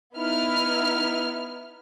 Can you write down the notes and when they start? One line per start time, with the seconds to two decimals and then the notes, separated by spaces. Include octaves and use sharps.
0.16 B3 D#4 E4 F6